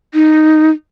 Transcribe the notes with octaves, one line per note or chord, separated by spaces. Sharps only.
D#4